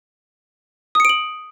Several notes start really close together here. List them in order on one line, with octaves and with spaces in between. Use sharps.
D#6 C#7 D7 F#7